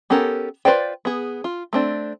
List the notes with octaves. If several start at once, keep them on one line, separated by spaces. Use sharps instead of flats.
B3 C#4 G4 A4 A#4
F4 B4 C5 D5 G5
B3 G#4
F4
A3 C4 D4